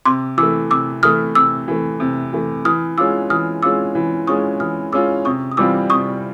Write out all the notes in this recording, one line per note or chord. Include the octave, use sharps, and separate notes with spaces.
C3 C6 D6
E3 D6 E6
A3
C3 D6 E6
E3 A3 D#6 F6
C3 D6 E6
E3 A3
C3
E3 A3
E3 D#6 F6
G#3 C#4 F4 D6 E6
E3 D#6 F6
G#3 C#4 F4 D6 E6
E3
G#3 C#4 F4 C#6 D#6
E3 D#6 F6
G#3 C#4 F4 D6 E6
C3 C#6 D#6
D#6
E3 G3 C4 F4 D6 E6
C3 C#6 D#6